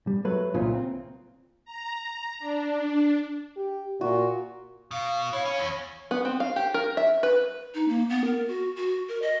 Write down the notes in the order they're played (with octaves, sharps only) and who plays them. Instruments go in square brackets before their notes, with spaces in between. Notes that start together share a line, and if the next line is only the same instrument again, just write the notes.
[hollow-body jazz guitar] G3
F#3 A3 B4
C2 A#2 C#3 E3 F4
C4
[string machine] A#5
D4
[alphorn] G4
[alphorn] A#2 [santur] F#4
[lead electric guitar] B2 [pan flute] F5
[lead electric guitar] E4 [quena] C#5 [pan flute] F5
[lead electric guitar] C#4 [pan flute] B5
[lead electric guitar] E2
[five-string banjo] B3
C4
F5
G4
A#4
E5
B4
[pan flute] D#4
A#3
B3
A#4
F#4
F#4
A#4
D#5